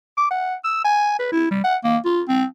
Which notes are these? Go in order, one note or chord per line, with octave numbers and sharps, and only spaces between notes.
D6
F#5
E6
G#5
B4
E4
G3
F#5
A#3
F4
C4